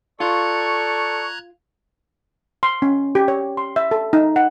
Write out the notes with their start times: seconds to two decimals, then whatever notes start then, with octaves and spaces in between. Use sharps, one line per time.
0.20 F4 A4 D5 A#5 C#6 F#6 G#6
2.63 C6
2.82 C#4
3.15 G4
3.28 C#5
3.57 C6
3.76 E5
3.91 A4
4.13 D#4
4.36 F#5